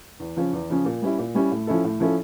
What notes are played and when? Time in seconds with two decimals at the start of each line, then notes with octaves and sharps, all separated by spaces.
0.20 E2
0.36 C#3 F3 C#4
0.53 E2
0.70 C#3 F3 C#4
0.85 A#2
1.02 G3 C#4 E4
1.18 A#2
1.35 G3 C#4 E4
1.51 A2
1.67 F3 C#4 E4 A4
1.84 A2
2.00 F3 C#4 E4 A4